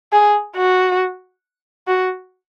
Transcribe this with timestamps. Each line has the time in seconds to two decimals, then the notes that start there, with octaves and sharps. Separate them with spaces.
0.12 G#4
0.56 F#4
1.88 F#4